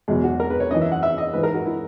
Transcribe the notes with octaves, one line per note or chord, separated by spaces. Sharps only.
E2 B2 F#3 G#3
F#4
A#4
B4
C#5
F#2 E3 D#5
E5
F#5
E5
D#5
G#2 E3 B4
A#4
F#4
E4